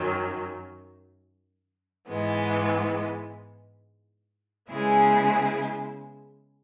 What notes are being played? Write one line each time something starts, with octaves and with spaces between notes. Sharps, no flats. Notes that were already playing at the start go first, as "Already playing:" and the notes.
Already playing: F#2 D#3 F#3
G#2 E3 G#3 B3
C#3 G#3 B3 E4 G#4